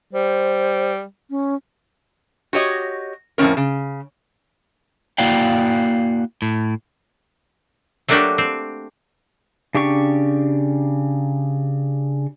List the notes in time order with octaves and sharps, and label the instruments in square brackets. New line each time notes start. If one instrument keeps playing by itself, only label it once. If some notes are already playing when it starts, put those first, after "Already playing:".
[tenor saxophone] G3 [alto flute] C5
[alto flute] C#4
[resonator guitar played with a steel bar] F#4 G4 C#5 D#5
F2 A2 D#3 C#4 A#4
C#3
[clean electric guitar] A#3 E4 F#4 D5 F5 G5
A2
[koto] F#3 A3 A#3 D4 F#4 G4
C4
[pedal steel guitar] C#3 D4 G4 G5 C#6